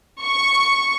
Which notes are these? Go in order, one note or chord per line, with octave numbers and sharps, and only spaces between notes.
C#6